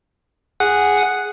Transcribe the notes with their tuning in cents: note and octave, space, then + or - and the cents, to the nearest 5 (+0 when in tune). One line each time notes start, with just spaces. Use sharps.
G#4 -5 F#5 +0